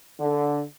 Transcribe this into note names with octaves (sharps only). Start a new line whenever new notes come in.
D3